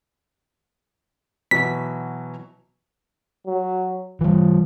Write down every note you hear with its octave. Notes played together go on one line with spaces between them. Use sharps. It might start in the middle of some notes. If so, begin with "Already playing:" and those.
B2 E3 F#3 B6
F#3
E3 G3 F4